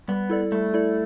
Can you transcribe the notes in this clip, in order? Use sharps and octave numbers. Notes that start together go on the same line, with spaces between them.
G3 B3
E4 A4 D5
G3 A3
E4 A4 D5